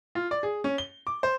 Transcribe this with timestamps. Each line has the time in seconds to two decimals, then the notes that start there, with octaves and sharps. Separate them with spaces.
0.15 F4
0.31 D5
0.43 G#4
0.64 C#4
0.78 G7
1.07 D6
1.23 C5